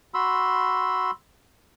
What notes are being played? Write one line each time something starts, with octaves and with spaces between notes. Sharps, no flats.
F#4 B5 C6 E6